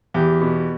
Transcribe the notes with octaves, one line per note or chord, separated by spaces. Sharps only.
E2 G4
B2